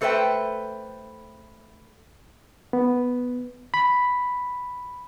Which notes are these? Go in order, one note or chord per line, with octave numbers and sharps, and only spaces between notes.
A3 A4 B4 C5 E5 G5
B3
B5